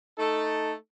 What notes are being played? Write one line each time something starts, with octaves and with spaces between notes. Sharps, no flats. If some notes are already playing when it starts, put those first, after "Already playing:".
A3 D#4 A4